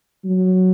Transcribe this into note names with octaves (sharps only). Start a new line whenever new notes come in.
F#3